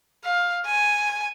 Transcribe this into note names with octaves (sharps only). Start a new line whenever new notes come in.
F5
G#5